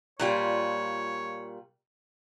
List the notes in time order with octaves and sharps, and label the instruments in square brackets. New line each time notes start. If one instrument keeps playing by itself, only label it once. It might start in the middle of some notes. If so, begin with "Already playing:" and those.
[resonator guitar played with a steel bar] A#2 G3 F4 [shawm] C#5